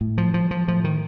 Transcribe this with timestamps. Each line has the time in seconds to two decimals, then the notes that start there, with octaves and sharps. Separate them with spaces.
0.01 A2
0.18 F3
0.34 F3
0.51 F3
0.68 A2 F3
0.84 D#3